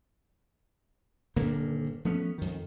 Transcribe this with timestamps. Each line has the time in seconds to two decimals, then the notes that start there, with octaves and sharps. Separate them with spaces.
1.36 D#1 G2 D3 A#3
2.05 F3 A3 B3 C#4
2.38 F2 D#3